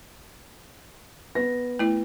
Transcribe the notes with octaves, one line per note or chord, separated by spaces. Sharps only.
B3 A#6
A3 E4